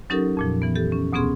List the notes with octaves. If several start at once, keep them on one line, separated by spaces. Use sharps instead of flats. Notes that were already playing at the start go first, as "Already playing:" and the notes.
F#3 C#4 D#4 G4 A4 A#4
F2 A#2 F3
E3 B3
G4 A4
C#4
D2 B2 B3 C#4 G#4 C6